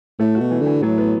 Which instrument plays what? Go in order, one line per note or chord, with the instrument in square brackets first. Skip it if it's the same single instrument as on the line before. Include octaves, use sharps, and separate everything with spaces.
[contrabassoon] A2 [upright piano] A3
[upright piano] F#4
[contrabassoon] B2
[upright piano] E3
[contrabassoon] D3
[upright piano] E3
[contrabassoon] A2 [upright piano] F#3
[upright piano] B3